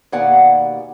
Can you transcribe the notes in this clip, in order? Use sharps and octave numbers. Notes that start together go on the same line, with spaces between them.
D#2 B2 D5 F#5 G#5 A#5